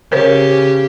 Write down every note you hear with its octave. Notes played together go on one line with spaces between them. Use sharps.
C#3 G4 A#4 C5 C#5